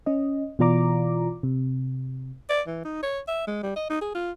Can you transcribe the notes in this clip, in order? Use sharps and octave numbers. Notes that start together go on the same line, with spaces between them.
C#4 D#5
B2 E3 F4 D5 A#5 D6
C3
D5
E3
D#4
C#5
E5
G#3
G3
D#5
D#4
G#4
F4